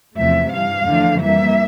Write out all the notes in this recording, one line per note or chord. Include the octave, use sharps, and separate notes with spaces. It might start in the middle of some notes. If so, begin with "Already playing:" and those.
E2 C3 F3 A3 E5
G2 E3 G3 F5
E2 D3 F3 A3
F2 E3 G3 A#3 E5